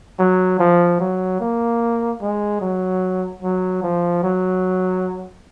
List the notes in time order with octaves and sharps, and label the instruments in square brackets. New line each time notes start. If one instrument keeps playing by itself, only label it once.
[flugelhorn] F#3
F3
F#3
A#3
G#3
F#3
F#3
F3
F#3